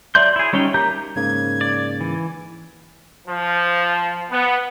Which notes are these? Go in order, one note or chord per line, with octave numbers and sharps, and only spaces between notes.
F#3 D5 E5 C6 G6
E4 G#4
G3 C#4 D#4 G4
A#3 G4 A#5 G6
G#2 C#3 A#3 G#6
D5
E3
F3
B3